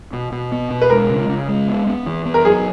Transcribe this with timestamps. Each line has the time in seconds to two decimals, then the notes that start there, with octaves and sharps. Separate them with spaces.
0.13 B2
0.32 B2
0.52 B3
0.70 B2
0.82 B4
0.90 G#3 A#4
1.10 C#3
1.29 C#3
1.48 G#3
1.67 B3
1.87 B3
2.06 E3
2.25 B3
2.34 A#4
2.45 F#3 G#4